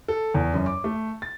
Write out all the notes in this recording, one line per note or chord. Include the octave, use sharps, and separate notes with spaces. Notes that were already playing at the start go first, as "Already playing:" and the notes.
A4
E2
F#2
D6
A3
A6